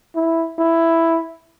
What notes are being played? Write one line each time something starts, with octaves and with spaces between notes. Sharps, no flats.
E4
E4